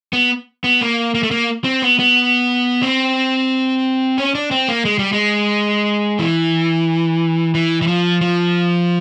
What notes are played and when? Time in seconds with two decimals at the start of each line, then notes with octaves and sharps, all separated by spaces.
0.13 B3
0.64 B3
0.81 A#3
1.15 A#3
1.23 A3
1.31 A#3
1.64 C4
1.82 B3
1.99 B3
2.83 C4
4.18 C#4
4.35 D4
4.51 C4
4.68 A#3
4.85 G#3
4.99 G3
5.12 G#3
6.19 E3
7.55 E3
7.82 E3
7.87 F3
8.21 F3